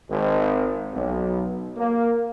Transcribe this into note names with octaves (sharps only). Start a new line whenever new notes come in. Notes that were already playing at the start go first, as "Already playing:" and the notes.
G#1
B1
A#3